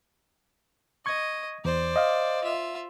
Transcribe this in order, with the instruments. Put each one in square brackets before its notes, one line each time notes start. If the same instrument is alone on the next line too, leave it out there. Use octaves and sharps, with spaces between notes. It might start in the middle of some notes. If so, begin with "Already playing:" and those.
[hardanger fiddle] D#5 [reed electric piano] C#6 G#6
[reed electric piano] E2 [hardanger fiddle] C5 D5
[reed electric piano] D#5 F5
[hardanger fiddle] F4 E5